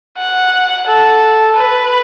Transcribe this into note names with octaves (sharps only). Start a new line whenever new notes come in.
F#5
A4
B4